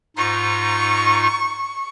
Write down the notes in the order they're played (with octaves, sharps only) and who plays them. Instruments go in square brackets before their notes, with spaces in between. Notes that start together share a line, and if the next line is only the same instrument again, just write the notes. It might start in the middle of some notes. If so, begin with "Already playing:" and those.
[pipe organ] G#2 D#4 F4 [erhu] C#6